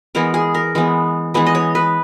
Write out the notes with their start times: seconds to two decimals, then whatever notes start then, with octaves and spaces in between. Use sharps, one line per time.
0.15 E3 G#3 B3 A#4
0.34 G#4
0.55 A#4
0.75 E3 G#3 B3
1.34 E3 G#3 B3 B4
1.46 D#5
1.55 C#5
1.75 B4